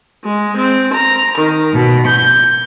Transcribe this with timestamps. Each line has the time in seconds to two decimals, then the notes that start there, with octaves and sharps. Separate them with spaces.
0.24 G#3
0.57 C4
0.94 A#5
1.37 D#3
1.72 B2
2.06 G6